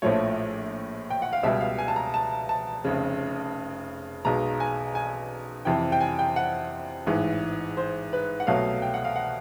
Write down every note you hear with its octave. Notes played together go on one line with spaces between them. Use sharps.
A#1 A2 F3 A3 C#5
G5
F#5
F5
C#2 B2 G3 E5
F5
G#5
A5
A#5
A5
A5
F1 F2 C#3
B1 B2 G#3 A#5
G#5
G#5
F2 C3 E3 G5
G5
G#5
G5
F#5
A1 G#2 E3
C5
B4
F#5
C2 B2 F#3 A3 F5
G5
F#5
F5
F#5